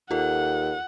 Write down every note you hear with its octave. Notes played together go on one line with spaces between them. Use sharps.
D#2 F4 A4 F#5